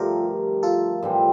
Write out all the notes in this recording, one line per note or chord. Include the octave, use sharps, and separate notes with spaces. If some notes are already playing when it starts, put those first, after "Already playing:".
Already playing: G2 D3 F3 A3 F4 G4 A4 A#4
F4 A4
A2 E3 G3 C4